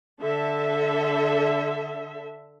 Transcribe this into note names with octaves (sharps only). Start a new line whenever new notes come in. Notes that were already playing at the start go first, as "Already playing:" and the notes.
D3 A4 E5